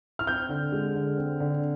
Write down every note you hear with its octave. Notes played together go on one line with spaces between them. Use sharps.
F6
C4 G6
D3
G#3
D3
C4
D3